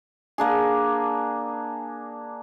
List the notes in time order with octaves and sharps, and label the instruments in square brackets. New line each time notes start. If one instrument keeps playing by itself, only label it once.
[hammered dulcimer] A#3 D4 G#4